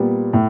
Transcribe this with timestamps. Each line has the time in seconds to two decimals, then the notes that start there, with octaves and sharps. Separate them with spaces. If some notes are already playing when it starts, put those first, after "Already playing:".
Already playing: A#2 G3 B3
0.33 A2